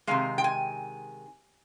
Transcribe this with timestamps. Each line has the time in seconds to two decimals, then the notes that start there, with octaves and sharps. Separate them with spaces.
0.07 C3 D#3 G#3 F5
0.38 G5
0.44 G#5